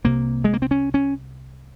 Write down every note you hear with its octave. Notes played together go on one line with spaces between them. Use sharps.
C2 C3 A#3
G#3
A#3
C4
C#4
C#4